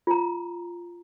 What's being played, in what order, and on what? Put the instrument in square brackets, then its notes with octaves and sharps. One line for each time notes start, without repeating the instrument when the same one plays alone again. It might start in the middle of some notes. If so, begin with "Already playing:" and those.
[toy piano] F4 A#5